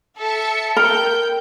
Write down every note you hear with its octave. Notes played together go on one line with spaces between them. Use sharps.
A4 E5 C#7
A#4 G5 G6